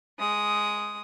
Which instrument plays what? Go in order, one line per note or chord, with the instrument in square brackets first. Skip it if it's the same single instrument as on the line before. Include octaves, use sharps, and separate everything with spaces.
[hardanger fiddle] G#3 D#6